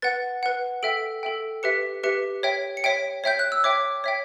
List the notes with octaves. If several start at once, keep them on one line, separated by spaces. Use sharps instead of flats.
B4 F#5 A6
B4 F#5
A4 E5 G5 D7
A4 E5 G5
G4 B4 E5 C#7
G4 B4 E5 C#7
C#5 E5 G5
C#7
C#5 E5 G5 D7
C#5 E5 G5 G6
F#6
E6
C#5 E5 G5 D6
C#5 E5 G5